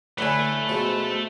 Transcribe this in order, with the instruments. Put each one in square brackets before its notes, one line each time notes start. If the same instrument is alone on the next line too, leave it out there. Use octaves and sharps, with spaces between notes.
[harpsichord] A2 D3 [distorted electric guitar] A3 [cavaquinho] B4 G#5
[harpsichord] G#2 B2 F3